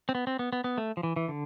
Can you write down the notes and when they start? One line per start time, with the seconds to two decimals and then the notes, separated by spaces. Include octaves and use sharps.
0.09 C4
0.15 B3
0.27 C4
0.39 B3
0.53 B3
0.64 B3
0.78 A3
0.97 F3
1.03 E3
1.16 E3
1.28 D3